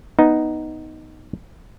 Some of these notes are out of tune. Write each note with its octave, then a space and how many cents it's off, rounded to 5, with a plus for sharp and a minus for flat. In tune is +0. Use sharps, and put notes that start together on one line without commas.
B3 +0 D#4 +0